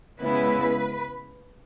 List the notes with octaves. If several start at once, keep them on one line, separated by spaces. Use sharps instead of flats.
C#3 G#3 B3 E4 B4